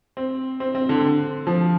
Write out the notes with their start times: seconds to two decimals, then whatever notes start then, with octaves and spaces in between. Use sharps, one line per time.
0.17 C4
0.60 C4
0.75 C4
0.89 D3
1.47 F3